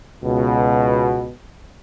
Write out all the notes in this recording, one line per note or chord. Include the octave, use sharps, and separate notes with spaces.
C#2 B2